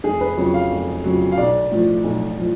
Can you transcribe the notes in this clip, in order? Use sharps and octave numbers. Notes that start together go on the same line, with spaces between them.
F1 G#4
B4
F2 C#3 F#3 C#5
F5
F1
F2 C#3 F#3
F5
B1 D5
A2 F3
B1
A2 F3